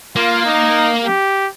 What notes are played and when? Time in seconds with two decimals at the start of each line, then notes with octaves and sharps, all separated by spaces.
0.16 A#3 F4
0.45 D#4
1.04 G4